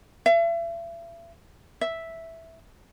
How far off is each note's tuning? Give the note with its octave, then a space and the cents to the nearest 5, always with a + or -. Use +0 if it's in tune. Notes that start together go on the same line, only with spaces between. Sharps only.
E5 +40
E5 -5